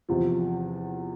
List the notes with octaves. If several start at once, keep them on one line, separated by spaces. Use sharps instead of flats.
E2 C3 F3